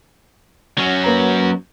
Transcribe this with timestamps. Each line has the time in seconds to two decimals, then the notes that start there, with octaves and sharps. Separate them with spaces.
0.78 F#3 C#4
1.04 A#3 B4 A#5